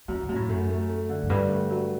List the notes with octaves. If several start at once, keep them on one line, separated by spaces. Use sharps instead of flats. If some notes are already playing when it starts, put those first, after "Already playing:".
F#2 E3
C3
F#2
A2
F#2 A3
A3
A3
D3
F#2
G2 D3
A3
F#3